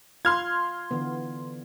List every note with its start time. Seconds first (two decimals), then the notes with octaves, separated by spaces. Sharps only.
0.25 F4 C6 F6 G#6
0.91 D3 E3 B3